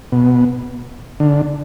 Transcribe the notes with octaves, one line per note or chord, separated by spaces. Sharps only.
B2
D3